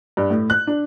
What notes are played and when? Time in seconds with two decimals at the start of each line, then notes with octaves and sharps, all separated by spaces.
0.17 G2
0.30 A2
0.50 F#6
0.67 D4